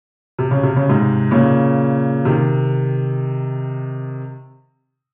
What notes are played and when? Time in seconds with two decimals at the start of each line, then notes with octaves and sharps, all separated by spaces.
0.39 C3
0.51 C#3
0.63 C3
0.76 C#3
0.89 G#2 C3
1.31 A#2 C#3
2.25 C3 D#3